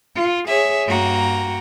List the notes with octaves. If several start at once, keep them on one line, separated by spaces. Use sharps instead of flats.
F4
G#4 C#5 E5
G2 A#3 F#4 G5 A#5